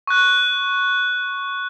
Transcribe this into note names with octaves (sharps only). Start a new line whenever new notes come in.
C#6 F#6